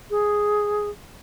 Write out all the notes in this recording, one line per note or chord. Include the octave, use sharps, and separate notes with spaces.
G#4